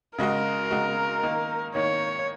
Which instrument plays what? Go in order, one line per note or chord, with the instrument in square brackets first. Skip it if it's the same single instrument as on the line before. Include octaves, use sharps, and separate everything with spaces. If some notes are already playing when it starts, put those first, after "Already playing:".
[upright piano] C#3 G#3 F#4 D#5 [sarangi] A#4
[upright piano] C#3 G#3 F#4 D#5
D#3 A#3 D#4
[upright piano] D#3 A#3 D#4 [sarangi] C#5